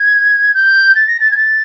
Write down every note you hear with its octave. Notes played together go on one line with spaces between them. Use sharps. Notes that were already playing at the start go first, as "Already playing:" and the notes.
Already playing: G#6
G6
A6
A#6
A6
G#6
A6